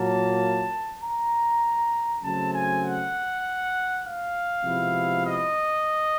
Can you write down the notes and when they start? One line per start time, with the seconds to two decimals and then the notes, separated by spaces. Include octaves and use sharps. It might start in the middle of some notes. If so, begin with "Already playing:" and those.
Already playing: A#2 F#3 A#3 A5
1.02 A#5
2.23 C#3 F#3 A3 C4 A5
2.53 G#5
2.83 F#5
4.03 F5
4.64 C3 F3 G#3 B3 E4
5.24 D#5